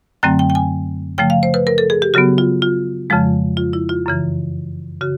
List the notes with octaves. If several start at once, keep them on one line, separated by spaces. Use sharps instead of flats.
F#2 D3 F#3 A3 C4 G5
G5
G5
G#5
C#3 F3 A3 G5
F5
C5
B4
A#4
A4
G#4
G4
C#3 F#3 B3 F#4
F4
F4
F2 C#3 F3 G#3
F4
E4
F4
F#2 C#3 E3
C#3 F#4